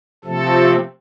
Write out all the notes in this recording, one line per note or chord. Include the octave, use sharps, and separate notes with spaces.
C3 F3 A3 C4 A4